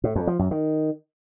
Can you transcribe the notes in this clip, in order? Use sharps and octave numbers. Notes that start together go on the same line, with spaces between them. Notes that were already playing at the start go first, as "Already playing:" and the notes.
A2
F2
F3
F#2
D#3